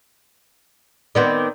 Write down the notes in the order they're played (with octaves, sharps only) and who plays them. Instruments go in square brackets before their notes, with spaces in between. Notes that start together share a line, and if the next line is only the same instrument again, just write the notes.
[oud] D#3 B3 C4 [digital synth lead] D5